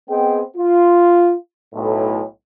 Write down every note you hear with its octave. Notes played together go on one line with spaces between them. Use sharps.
B3 C4 G#4 D#5 G5
F4
B1 A2